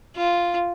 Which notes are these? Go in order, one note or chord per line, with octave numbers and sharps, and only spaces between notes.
F4